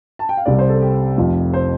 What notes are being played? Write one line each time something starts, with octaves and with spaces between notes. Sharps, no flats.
A5
G5
F5
C2 C3 G3 D5
C5
A4
G4
F1 F2 F3
C5